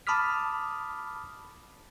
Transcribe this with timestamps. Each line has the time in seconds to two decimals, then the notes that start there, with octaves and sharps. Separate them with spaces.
0.07 A5 B5 D6 D#6 F6 B6